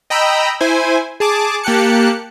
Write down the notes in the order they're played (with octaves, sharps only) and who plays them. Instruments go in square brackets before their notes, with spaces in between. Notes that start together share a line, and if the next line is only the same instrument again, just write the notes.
[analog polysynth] D#5 G5 A#5 B5 E6
E4 C5 G#5
G#4 A5 D6
A#3 G4 A5 F#6 C#7